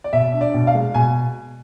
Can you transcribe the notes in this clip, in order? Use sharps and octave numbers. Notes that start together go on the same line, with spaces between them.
D5
B2 E5
D4
D5
B2
F5
G#3
B2 G#5